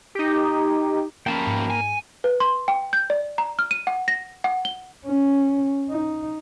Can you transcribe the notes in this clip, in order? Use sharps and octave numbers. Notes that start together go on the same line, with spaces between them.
D#4 G4
F3 A#3 C#4 G5 A5 B5
G#2
G#5
B4
C6
G5
G6
D5
A#5
F6
D#7
F#5
A#6
F#5
G7
C#4
D#4